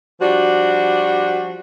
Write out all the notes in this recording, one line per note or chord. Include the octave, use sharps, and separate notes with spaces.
F3 G3 D4 F#4